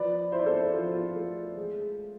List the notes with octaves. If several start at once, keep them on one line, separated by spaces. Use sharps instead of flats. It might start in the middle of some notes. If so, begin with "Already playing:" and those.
Already playing: F3 B4 D5
E4 C5
D5
A4 C5
F3 F4
F4
A3
G#3